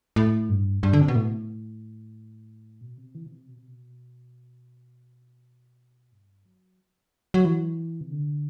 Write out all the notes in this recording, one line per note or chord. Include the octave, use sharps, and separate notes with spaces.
A2
G2
G2
D3
C3
B2
A2
B2
C3
E3
B2
C3
B2
C3
B2
G2
F#3
F#3
E3
C3
D3